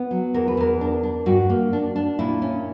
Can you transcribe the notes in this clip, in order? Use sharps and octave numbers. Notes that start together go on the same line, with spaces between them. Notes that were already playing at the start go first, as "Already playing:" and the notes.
Already playing: B3
F#3
E2 A#4
B4
E2 A#4
D4
D4
G2 F#4
A#3
D4
D4
A#2 E4
C#4